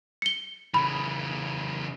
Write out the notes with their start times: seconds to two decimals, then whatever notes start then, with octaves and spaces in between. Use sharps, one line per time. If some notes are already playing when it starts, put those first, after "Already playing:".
0.22 C#7 G7
0.74 C#3 E3 B5